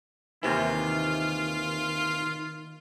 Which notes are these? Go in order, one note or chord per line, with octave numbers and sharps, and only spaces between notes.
D#2 C3 D#3 E3 F4